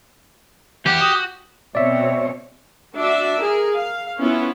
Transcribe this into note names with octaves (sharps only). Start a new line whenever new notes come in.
E3 G4 F#5
F#4 D#6
B2 C4 C#5 D5 E5
D4 F#4 D5 E5
G#4 A#4
F5
B3 C#4 E4 F4 B4